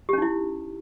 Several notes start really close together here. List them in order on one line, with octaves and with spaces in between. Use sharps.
G4 C#4 D#4 E4